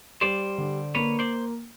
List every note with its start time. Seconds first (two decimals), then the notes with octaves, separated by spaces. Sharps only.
0.21 G3 C5 D5
0.58 D3
0.95 A#3 B4 C#5
1.19 C5 D5